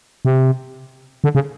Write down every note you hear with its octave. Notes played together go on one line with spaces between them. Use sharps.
C3
D3
C#3